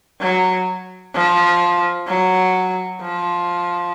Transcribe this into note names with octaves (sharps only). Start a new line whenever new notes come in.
F#3
F3
F#3
F3